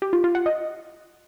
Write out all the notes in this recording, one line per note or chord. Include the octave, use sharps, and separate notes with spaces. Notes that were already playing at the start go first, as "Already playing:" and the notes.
G4
F4
F4
F#5
D#5